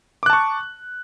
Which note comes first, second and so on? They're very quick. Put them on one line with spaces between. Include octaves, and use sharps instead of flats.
D6 F#6 A5 C#6